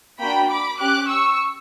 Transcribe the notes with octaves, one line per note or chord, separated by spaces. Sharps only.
A#3 D4 F#4 G5 B5
B5 D6
C#4 G4 D6 F#6
C#6 E6